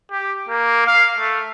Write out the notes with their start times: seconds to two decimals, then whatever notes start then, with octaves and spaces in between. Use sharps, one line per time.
0.11 G4
0.49 A#3
0.87 F5
1.18 A3